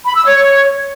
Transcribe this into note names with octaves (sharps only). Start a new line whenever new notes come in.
B5
E6
C#5